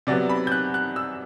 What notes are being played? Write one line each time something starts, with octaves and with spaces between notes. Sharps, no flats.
C3 F#3 B3 D5
B5
G6
F#6
F#6
E6